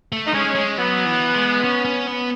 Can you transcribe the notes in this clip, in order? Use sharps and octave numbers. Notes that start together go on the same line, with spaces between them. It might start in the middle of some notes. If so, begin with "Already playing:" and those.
A3
D#4
G#3 C#4
G#3
F#3 B3
E3
G#3
C#4
C#4
B3